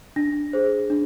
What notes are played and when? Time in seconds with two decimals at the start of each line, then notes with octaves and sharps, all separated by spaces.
0.16 D4 A#6
0.53 G#4 C5
0.90 D4